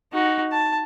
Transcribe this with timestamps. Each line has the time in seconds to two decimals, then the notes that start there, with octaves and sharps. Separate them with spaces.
0.13 D#4 F#4
0.52 A5